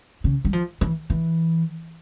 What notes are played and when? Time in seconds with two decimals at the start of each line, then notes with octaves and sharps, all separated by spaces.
0.24 C#3
0.45 G3
0.53 F3
0.81 E3
1.10 E3